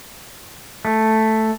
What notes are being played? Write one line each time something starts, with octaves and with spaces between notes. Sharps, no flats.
A3